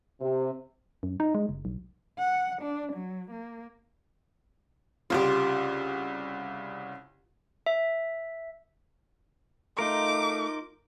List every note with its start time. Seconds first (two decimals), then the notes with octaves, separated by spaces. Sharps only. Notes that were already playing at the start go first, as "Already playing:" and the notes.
0.21 C3
1.03 F#2
1.20 D#4
1.35 G#3
1.49 F#1
1.65 B1
2.19 F#5
2.62 D4
2.93 F#3
3.31 A#3
5.10 C2 C#3 F4 G4
7.66 E5
9.79 A3 D#4 F4 A#4 D6